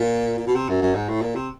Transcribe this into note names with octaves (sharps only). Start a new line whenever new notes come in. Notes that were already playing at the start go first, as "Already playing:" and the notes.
Already playing: A#2
A#2
B2
C3
F#2
F#2
G#2
A2
A#2
C3